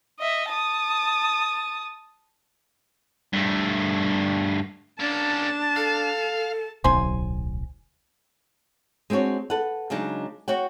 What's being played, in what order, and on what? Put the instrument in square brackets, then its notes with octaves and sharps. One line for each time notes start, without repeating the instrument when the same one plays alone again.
[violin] D#5 E5
A5 D#6
[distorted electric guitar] G2 A3
[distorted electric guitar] A#3 C#4 [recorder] D4 [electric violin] A5
[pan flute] A4 [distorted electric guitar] F5
[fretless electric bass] D1 B1 [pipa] C5 G#5
[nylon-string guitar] G#3 C4 D4 F#4 C#5
A4 B4 F#5
C#3 F#3 G#3 D4 D#4
F#4 C#5 F#5 G5